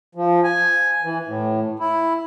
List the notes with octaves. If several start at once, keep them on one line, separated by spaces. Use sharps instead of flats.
F3
G#5
E3
A2
E4